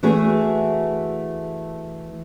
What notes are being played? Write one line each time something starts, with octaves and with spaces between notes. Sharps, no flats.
E3 A3 F#4 G#4